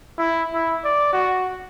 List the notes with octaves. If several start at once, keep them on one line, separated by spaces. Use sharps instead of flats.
E4
E4
D5
F#4